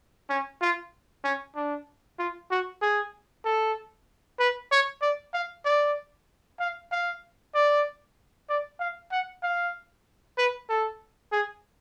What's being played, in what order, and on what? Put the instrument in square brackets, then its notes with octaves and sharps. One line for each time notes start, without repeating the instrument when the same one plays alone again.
[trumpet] C#4
F4
C#4
D4
F4
F#4
G#4
A4
B4
C#5
D5
F5
D5
F5
F5
D5
D5
F5
F#5
F5
B4
A4
G#4